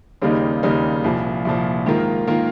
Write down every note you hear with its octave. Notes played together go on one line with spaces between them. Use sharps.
D#2 C#3 G3 A#3 D#4
D#2 C#3 G3 A#3 D#4
C2 A#2 F3
C2 A#2 F3
G#2 D#3 A#3 F4 A#4
D#3 A#3 F4 A#4